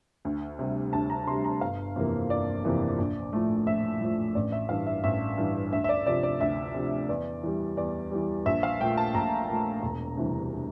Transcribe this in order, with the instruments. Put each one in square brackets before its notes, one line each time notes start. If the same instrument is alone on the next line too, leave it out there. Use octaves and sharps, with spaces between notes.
[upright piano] D2
C3 G3
D2 A5
A#5
C3 G3 C6
A#5
G1 F5
F2 C3 E3 A#3
G1 D5
F2 C3 E3 A#3
A#1
A2 F3 A3
A#1 E5
A2 F3 A3
A1 D5
E5
G2 E3 F5
E5
A1 E5
G2 E3
D2 E5
E5
D5
C3 F3 D5
D5
D2 E5
C3 F3
E2 D5
E3 G3
E2 D5
E3 G3
A#1 E5
F5
A#2 A3 G5
A5
A#1 A#5
A#2 A3
E1
D2 C3 E3 G3